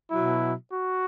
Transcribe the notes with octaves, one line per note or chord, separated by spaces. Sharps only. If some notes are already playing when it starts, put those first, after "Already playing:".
B2 F#3 E4
F#4